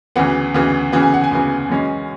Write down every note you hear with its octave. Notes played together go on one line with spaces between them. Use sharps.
D2 C#3 E3 B3 F#5
D2 C#3 E3 B3
D2 C#3 E3 B3
G#5
F#5
G#5
D2 C#3 E3 B3
F#2 E3 G#3 C#4